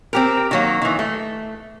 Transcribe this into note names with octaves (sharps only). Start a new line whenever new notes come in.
C4 G4 A#4
D#3 F#3 A#3
D#3 E3
A3